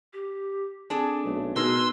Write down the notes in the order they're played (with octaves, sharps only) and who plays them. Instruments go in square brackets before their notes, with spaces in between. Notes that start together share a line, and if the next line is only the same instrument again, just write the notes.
[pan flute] G4
[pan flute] C4 [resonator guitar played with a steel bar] D4 G#4 A4
[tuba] B1 [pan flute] A3
[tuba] B2 [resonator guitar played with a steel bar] D#4 G#4 A#4 [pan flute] B4 [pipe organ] C6 E6